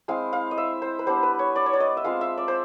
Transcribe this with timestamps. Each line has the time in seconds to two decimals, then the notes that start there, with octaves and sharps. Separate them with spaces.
0.08 G#3 C4 E4 F5
0.33 F5
0.51 D#5
0.57 E5
0.82 C5
0.99 B4
1.06 G3 B3 D4 C5
1.23 B4
1.39 C#5
1.56 D5
1.66 C#5
1.73 D5
1.80 D#5
1.97 E5
2.04 G#3 C4 F4 F5
2.21 E5
2.37 D5
2.48 C5